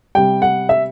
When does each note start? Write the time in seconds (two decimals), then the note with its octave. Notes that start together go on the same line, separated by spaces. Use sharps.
0.15 C3 G3 G5
0.42 F#5
0.69 E5